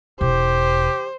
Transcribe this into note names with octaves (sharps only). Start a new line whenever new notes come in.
E1 G4 C5